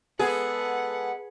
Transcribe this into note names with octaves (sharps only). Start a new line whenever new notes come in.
G#3 B3 G#4 A4 B4 F#5